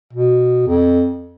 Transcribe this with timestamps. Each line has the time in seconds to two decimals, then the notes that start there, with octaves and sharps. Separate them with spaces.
0.13 B2
0.67 F2